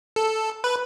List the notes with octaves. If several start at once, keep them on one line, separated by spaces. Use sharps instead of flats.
A4
B4